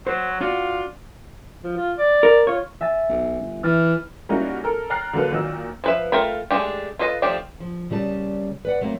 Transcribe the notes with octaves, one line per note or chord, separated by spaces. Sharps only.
F#3 C5
D4 F4 F#4
F3
F4
D5
A#4
F4 C#5
E5 G#5 A6
B1
G1
E3 F6 A6
G3 A#3 C#4 D#4 E4 F#4
A4 A#4
G5 A#5 F6 F#6 A6 C7
D3 F#3 A#3 A4 B4
A#2 D#3 F#3 D#5 E6
F3 B4 E5
A3 F4 A#4 G5 B5
G#3 A3 D4 F4 G4
F4 A4 B4 D#5
F3 A3 D4 G4
F3
A#2 C#3 G3 B4 A5
B4 D5 F#5
F#3 A3 A#3 C4 A#4